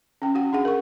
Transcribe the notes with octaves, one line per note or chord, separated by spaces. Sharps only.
C#4 G5
C#4 F#4 F#5
D4 G#4 F#5
A#4 C#6